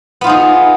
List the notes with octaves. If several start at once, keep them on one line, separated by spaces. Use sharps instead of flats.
B3 D#4 F4 G#4